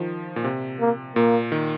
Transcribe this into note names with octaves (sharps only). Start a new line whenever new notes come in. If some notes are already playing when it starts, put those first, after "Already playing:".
Already playing: D#3 F3
A#2
C3
A#3
A#2 A#3
D#3